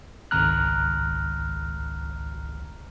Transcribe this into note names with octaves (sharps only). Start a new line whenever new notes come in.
G#1 C#2 A#5 F6 F#6